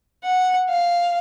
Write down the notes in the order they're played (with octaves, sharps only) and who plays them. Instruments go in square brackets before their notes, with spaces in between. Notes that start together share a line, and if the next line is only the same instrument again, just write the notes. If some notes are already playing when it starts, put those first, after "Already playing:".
[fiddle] F#5
F5